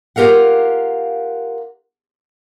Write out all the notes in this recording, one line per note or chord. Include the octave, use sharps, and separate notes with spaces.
F4 G4 A#4 F5 F#5